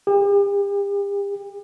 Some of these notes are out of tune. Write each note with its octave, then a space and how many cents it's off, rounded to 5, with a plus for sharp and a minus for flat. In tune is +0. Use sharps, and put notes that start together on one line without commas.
G4 +40